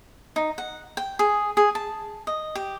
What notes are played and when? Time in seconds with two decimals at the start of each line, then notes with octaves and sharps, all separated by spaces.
0.36 D#4
0.58 F#5
0.97 G5
1.19 G#4
1.57 G#4
1.75 A5
2.27 D#5
2.55 G4